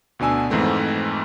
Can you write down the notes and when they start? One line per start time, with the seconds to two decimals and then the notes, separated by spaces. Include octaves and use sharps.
0.19 D2 B2 D4 G#5 E6
0.50 F2 G#2 E3 A3 C4